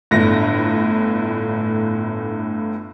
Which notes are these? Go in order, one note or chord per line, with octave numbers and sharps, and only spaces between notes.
G1 A2 D3 A#6